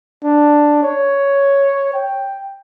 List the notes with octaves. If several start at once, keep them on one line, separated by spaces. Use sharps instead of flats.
D4
C#5
G5